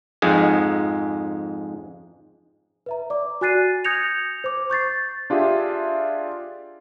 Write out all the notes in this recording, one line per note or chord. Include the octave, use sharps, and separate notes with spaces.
F2 G#2 G#3
B4 E5 A#5
D5 D6
F#4 G#5 F#6 A6 C7 D#7
D#6 G6 G#6 A#6 C#7 F7
C5 D6
C#6 G6 A6 C7
D4 F4 G4 G#4 E5